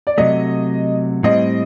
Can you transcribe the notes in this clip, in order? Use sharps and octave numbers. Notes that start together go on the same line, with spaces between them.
D5
C3 F#3 A3 D#5
A2 G3 C4 D#5